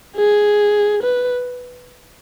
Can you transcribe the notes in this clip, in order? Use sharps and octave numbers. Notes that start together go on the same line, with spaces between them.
G#4
B4